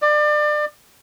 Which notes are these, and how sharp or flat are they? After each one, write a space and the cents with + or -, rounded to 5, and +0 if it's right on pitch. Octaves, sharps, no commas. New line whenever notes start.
D5 +30